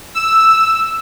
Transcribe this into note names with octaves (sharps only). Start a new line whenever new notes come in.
E6